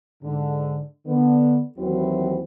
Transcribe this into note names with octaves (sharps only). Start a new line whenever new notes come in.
G#2 D3
D3 B3
D#2 E3 F#3 C4 E4 F#4